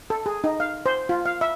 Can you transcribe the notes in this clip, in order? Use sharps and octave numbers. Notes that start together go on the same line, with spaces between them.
A4
G#4
D#4
F5
C5
F4
F5
E5